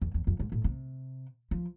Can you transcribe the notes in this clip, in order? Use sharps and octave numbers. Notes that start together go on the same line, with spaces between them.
E2
E2
F2
G#2
A2
C3
F3